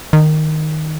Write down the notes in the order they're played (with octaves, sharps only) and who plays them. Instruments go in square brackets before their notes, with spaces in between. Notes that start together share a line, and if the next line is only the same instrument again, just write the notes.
[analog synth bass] D#3